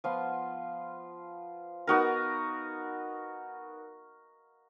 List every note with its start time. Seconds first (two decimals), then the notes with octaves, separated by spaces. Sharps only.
0.04 F3 B3 F4
1.87 B3 D#4 F#4 A#4